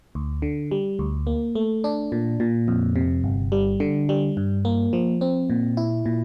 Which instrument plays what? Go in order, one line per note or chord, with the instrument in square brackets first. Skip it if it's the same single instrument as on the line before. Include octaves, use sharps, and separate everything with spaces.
[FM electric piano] D2
D3
G3
D2
A#3
A3
D4
A#2
A#2
F2
C3
G1
G3
D3
G3
G2
A#3
F3
C4
A#2
E4
A#2